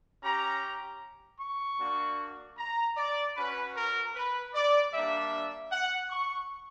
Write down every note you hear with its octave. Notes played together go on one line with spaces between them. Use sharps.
C#4 G4 A#5
C#6
A#3 D4 F#4
A#5
D5
C#4 F#4 B4
A#4
B4
D5
G3 A#3 D4 E5
F#5
C#6